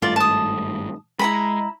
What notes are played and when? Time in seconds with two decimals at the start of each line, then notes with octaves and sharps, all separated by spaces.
0.02 G#1 G2 A3 F4 D5
0.16 A5 D#6
1.19 G#3 E4 A#5 B5